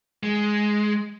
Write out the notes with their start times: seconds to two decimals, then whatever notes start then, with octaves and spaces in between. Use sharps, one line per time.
0.23 G#3